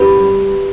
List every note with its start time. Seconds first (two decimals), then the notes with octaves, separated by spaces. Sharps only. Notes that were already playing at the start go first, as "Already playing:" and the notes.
Already playing: F#2 G4 B4
0.17 G3